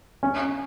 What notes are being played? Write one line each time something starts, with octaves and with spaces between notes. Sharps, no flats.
C#4